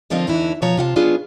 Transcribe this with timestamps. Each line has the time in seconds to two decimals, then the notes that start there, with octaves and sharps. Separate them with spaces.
0.10 D#2 D3 F3 C4 F4 D#5
0.27 E2 D3 E3 D#4 E4
0.62 B2 F3 C#5 A#5
0.77 C3 F4 F#5 A5
0.96 B2 F#3 B3 D4 F4 G#4